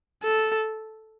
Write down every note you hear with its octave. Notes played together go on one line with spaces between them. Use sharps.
A4